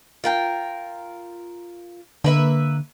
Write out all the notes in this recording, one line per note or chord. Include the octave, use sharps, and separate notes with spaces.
F4 A#4 G5
D3 A#3 B4 E5